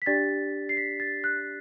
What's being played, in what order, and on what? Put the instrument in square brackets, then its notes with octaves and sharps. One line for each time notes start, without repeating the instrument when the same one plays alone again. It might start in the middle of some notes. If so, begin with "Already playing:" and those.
[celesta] B6
D4 G4 D5 A6
C7
B6
A6
F#6